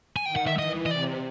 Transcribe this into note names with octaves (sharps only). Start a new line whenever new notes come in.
G#5
D#3 G5
F#5
E5
E3 D#5
D#5
C3 D5